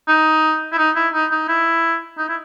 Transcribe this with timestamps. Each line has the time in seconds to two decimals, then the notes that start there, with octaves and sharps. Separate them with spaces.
0.08 D#4
0.72 E4
0.78 D#4
0.96 E4
1.14 D#4
1.31 D#4
1.49 E4
2.18 D#4
2.29 E4